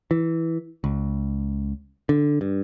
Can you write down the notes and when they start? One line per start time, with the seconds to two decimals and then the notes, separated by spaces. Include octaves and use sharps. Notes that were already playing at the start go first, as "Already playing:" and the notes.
0.11 E3
0.84 C#2
2.09 D3
2.41 G2